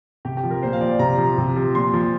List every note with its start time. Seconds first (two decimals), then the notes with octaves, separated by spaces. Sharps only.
0.25 C3 G4
0.37 G4
0.43 F3
0.51 A#4
0.63 A#2 C5
0.73 F5
0.81 F3 D5
0.99 C3 A#5
1.18 F3
1.38 C3
1.56 F3
1.75 A#2 C6
1.93 F3